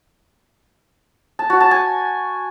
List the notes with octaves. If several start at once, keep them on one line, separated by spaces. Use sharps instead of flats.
A5
F#4
A5
G#5